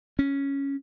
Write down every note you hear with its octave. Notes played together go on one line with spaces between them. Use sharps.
C#4